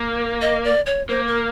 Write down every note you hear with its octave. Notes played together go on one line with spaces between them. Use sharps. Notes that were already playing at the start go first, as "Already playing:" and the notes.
Already playing: A#3
D#5
D5
C#5
A#3 C5
A#4